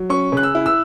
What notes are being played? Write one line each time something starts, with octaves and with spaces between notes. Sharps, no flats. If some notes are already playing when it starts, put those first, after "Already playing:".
Already playing: F#3
C#4 C#6
C#3 F#6
E6
E4
E6